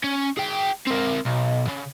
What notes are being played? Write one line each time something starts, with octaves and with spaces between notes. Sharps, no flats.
C#4
G#4 G5
C4 A#4
B1
C#3